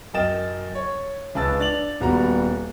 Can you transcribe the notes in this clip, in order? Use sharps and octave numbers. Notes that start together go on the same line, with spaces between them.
F#2 A#4 D#5 G5 A6 E7
C#5
C#2 C#4 B4 A5 E6 A6
D4 A6 F7 F#7
D#1 G3 B3 F#4 A#5